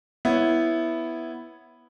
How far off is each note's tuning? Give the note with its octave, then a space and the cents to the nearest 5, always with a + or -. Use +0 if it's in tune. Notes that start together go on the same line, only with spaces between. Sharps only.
B3 +0 E4 +0 C#5 +0